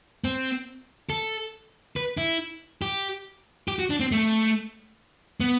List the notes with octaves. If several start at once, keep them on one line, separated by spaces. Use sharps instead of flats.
C4
A4
B4
E4
G4
G4
F#4
D4
C4
A3
B3